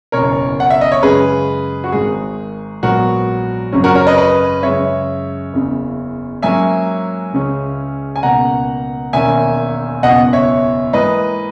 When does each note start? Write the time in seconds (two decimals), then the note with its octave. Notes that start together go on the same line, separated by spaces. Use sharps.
0.12 F#1 E2 B2 A#4 C#5
0.60 F#5
0.70 E5
0.81 D#5
0.92 C#5
1.03 F#2 C#3 G#3 G#4 B4
1.84 F#4
1.92 G#1 G#2 D#3 G#4
2.83 A#1 G#2 F#3 B3 F#4 A#4
3.72 G#1 F#2 C#3 F#3 C#4
3.84 F#4 A#4
3.95 A#4 C#5
4.07 B4 D#5
4.18 B4 D#5
4.63 F#2 C#3 G#3 C#5 E5
5.53 F#1 E2 C#3
6.42 G#2 F#3 A#3 C#4 E5 G#5
7.33 C#2 C#3 G#3 C#4
8.16 G#5
8.23 C#2 B2 A#3 F#5 A#5
9.13 E1 D#2 D#3 A#3 C#4 E5 G#5
10.03 F#1 E2 B2 D#5 F#5
10.33 C#5 E5
10.93 G#2 E3 A#3 B4 D#5